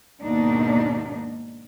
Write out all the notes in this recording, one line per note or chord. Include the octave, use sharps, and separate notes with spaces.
D#2 G#2 B2 A#3 D4 D#4